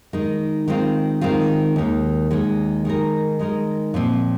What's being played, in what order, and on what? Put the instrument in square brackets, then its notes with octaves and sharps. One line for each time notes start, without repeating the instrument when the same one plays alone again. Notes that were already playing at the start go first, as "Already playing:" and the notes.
[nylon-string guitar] D#3 G#3 D#4
D#3 G#3 C4 F4
D#3 G#3 C4 F4
D#2 D#3 G#3
D#2 D#3 G#3
D#3 G#3 D#4 A#4
D#3 G#3 D#4 A#4
A#2 F3 C4